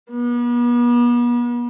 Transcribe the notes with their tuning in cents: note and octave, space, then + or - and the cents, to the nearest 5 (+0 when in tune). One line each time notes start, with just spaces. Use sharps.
B3 -40